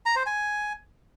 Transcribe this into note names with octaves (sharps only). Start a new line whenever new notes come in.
A#5
C5
G#5